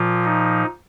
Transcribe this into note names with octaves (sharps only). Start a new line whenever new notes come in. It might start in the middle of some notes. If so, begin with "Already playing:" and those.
Already playing: A#2 F3 F4
D#4